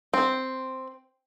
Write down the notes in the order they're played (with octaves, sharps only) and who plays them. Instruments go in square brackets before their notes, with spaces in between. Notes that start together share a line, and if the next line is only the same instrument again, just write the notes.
[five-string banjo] C4